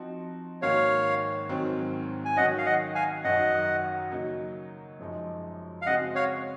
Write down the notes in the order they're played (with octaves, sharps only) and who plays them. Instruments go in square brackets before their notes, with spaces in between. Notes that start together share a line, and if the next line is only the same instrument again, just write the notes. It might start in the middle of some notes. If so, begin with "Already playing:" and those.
Already playing: [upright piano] F3 C4 D#4 F#4
[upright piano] G#2 D#3 A#3 C#4 F#4 [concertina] C#5 F5
[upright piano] G#2 D#3 F#3 C4
[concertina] G#5
[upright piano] D#3 F#3 C#4 [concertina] D#5 F#5
[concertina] F5
D#5 F#5
F5 G#5
[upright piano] F#2 D#3 F#3 [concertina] D#5 F#5
[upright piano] C#3 F#3 A#3 D#4
F#2 F3 G#3 D#4
[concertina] F5
[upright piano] C#3 G#3 C4 F#4 [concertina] D#5 F#5
[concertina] C#5 F5